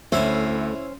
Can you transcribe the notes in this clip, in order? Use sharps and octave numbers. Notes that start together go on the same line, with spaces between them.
D2 A3 C#4 E4 C5 C#5